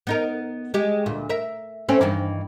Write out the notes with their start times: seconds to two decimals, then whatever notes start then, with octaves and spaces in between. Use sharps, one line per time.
0.07 B3 D#4 A#4
0.74 G#3 G4
1.06 D2 A#2
1.29 A#4 E5
1.89 A3 C4 C#4
2.01 G2 D#3 E3